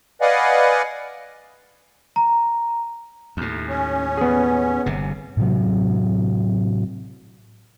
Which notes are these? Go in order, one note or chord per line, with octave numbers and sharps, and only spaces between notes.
B4 D5 D#5 F5 F#5 G#5
A#5
D#2 A2
C#4
B3 G#4
G1 C3
A2 C3 F#3